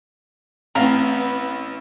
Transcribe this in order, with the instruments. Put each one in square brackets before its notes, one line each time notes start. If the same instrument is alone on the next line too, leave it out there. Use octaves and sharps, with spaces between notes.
[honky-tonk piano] A1 [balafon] A3 C4 [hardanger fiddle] B3 [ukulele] F5 A#5